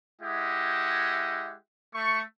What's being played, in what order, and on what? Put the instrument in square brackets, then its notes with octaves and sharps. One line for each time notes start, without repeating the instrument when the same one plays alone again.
[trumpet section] G#3 E4 G4 D#5 E5 F#5
A3 C#6